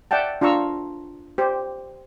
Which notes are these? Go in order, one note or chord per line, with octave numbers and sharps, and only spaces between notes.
D5 E5 F#5 G5 A5
D4 F4 F5 A#5 C#6 E6
G4 C5